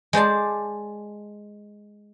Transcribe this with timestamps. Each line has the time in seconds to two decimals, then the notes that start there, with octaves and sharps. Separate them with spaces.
0.13 G#3 C5 D5 A5